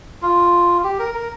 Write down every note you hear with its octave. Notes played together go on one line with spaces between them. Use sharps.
F4
G4
A#4
A#4